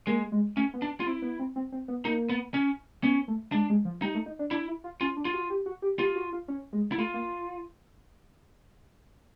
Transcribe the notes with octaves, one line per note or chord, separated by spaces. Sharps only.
G#3 A#3
G#3
A3 C#4
B3
D4
F4
C4 E4
B3
C4
C4
C4
B3
A#3 D#4
B3
C#4
B3 C#4
A3
G#3 D4
G#3
F3
G3 D#4
A3
D#4
D4
D4 E4
E4
F4
C#4 F4
D4
F4
F#4
G4
F#4
G4
F4 G4
F#4
F4
C#4
G#3
E4
A3 F4
A#3